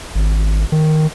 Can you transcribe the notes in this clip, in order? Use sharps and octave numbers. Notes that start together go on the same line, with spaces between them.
G#1
D#3